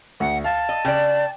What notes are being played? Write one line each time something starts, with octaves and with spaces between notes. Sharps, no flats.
D2 F#5
F5 A5
D#5
C#3 D5 G5